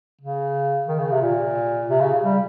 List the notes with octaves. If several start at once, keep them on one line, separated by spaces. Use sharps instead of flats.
C#3
D#3
C#3
C3
A#2
C3
C#3
G3